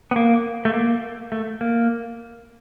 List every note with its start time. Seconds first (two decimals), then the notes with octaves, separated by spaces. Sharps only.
0.11 B3
0.16 A#3
0.65 A3
0.74 A#3
1.32 A3
1.61 A#3